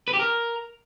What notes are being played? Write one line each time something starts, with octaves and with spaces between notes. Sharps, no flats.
B4
G4
A#4